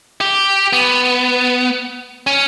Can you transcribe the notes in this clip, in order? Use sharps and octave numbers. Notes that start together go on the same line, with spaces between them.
G4
B3
C#4